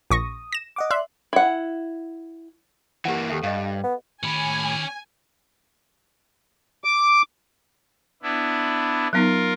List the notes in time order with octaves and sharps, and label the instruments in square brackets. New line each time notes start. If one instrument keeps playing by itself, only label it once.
[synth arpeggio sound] A#1 C#6 A#6 [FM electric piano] D#6
[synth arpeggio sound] A#6 E7
[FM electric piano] D#5 F#5 D6
[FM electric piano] D5 C6 F#6 [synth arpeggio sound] E5
[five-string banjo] E4 F#5
[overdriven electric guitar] E3 A#3 [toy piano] G4 F#5
[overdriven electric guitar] D#2 [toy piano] G4 A4 E5
[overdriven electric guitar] G2 [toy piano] D#5 F5
[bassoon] B3
[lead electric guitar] A2 B5 [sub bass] D#3 [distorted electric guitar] C#4 G4 [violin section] G#5
[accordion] D6
[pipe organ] B3 D4 E4
[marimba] F#3 B3 D#4 [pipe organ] F4 A#4